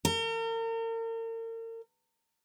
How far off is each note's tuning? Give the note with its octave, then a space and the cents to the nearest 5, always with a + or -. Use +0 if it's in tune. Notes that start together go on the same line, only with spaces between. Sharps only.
A#4 -40